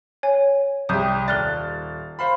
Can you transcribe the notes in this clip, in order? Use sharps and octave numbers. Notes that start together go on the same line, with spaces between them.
C#5 G#5
C2 G4 D#6 G6 G#6
D#1 D5 F6 F#6 A6 G7
C5 F5 B5